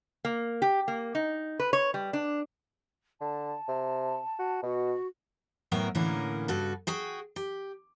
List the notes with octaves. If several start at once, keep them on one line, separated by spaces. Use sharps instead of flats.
A#3
G4
A#3
D#4
B4
C#5
G3
D4
D3 A5
C3
F#4
B2 F#4
A2 F#3 B3 A#4 G5
A2 D3 E3 A#3 C#4 A#4
G2 C#3 F#4 A4
F#4 G#4 G5
G4